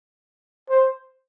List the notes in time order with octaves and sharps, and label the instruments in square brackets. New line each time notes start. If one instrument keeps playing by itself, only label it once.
[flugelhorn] C5